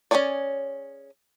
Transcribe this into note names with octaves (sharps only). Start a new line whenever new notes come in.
C#4 D4 G#4 C#5 D5